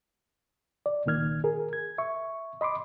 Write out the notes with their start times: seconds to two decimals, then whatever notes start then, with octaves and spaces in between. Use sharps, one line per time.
0.86 D5
1.06 C#2 A#2 D#3 F6 G#6
1.44 G#4 A#4
1.73 G#6
1.98 E5 C#6
2.61 D#5 B5 C6 D6